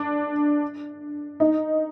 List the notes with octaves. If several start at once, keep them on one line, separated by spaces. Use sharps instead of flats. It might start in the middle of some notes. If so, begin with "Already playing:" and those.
Already playing: D4
D#4